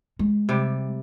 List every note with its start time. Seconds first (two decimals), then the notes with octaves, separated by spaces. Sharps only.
0.19 G#3
0.49 C3 G3